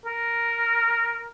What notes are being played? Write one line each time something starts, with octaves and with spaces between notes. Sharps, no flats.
A#4